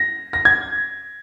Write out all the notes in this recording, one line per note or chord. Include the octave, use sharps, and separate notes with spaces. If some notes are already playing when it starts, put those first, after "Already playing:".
Already playing: A#6
A#6
G#6